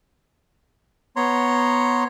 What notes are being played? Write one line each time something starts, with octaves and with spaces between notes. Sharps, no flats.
B3 C#5 A#5 C6